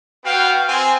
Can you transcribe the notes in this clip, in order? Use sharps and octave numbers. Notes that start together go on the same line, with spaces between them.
B3 F#4 F5 G5
C4 G#5 C6